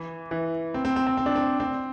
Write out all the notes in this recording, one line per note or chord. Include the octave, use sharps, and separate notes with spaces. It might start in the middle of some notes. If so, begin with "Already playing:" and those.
Already playing: E3
E3
C4
C4
C4
C4
C4
D4
C4
C4